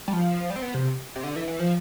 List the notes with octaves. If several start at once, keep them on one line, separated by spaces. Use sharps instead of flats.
G3
F3
G3
C4
B3
C3
C3
D3
E3
E3
F3